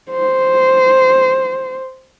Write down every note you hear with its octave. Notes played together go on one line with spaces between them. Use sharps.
C5